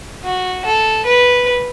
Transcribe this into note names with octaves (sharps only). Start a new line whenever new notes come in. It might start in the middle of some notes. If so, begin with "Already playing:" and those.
F#4
A4
B4